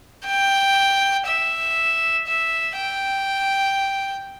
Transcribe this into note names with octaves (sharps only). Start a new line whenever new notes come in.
G5
E5
E5
G5